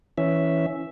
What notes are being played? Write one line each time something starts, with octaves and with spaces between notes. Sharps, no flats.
E3 C#4 E5